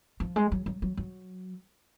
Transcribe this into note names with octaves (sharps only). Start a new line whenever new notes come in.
F3
G#3
F#3
F#3
F#3
F#3